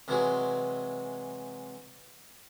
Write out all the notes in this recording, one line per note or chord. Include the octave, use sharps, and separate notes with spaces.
C3 E3 F#3 G#3